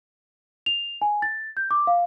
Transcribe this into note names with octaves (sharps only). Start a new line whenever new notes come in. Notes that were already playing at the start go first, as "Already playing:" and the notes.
F7
G#5
A6
G6
D6
F5